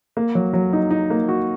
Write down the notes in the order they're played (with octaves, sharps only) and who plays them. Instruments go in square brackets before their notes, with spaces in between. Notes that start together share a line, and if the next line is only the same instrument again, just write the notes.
[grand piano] A#3
F#3
F#3
D#4
D#4
A#3
F#4